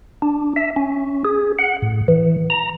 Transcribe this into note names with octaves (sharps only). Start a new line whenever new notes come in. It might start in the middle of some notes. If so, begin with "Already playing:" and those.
D4
E5
C#4
G#4
F#5
A2
E3
A#5